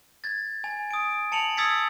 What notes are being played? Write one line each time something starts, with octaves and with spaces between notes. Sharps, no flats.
G#6 A6
G#5
D#6 D7
A5 C#7 F7 F#7
D#6 E6 G#6 A6 B6 C#7